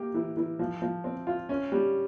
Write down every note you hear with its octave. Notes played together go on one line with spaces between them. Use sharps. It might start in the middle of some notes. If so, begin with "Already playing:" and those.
Already playing: A#3 G4
E3
E3
F3
F3
C4
F4
C#4
G3